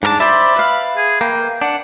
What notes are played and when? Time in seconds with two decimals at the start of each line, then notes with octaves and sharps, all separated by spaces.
0.03 G#2 D4 A#4 A5
0.20 C5 D5 E5 B5
0.56 B4 F5
0.97 G#4
1.21 A#3 G5
1.62 D4 F#5